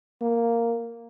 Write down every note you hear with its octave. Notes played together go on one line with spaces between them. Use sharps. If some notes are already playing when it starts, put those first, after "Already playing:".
A#3